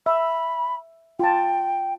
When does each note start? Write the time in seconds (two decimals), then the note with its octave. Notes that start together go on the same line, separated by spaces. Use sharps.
0.06 E5 B5
1.19 F4 G5 A5